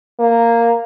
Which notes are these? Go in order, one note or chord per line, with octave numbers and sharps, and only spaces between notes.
A#3